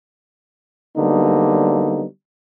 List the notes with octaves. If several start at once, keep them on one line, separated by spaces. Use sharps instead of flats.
D3 F#3 G3 A#3 B3 D#4